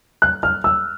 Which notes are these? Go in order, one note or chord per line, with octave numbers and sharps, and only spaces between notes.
F#6
F6
E6